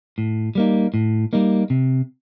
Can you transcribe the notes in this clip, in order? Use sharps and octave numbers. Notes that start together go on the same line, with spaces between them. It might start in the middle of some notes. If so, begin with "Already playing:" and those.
A2
G3 A#3 D#4
A2
G3 A#3 D#4
C3